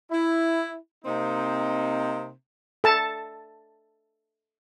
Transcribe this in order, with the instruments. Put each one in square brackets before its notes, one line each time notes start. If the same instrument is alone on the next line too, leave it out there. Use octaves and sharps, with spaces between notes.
[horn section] E4
C3 A#3 C4 D#4
[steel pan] A4 A5